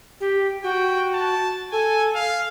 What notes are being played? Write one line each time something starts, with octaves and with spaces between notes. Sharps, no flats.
G4
F#4 G5
A5
A4 G#5
F5